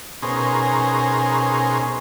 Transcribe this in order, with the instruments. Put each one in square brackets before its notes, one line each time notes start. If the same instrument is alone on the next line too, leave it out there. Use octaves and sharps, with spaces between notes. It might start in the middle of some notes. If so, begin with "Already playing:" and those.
[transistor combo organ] B2 C#4 D#4 G#4 A#4 C5